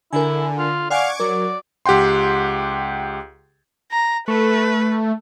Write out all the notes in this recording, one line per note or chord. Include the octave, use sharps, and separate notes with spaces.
D3 E4 A#4 G#5
F4
D5 F5 F#5 G#5 C#6 D6 G#6
F#3 A#4 D5
C#2 G4 F#5 G5 C6
A#5
A3 B4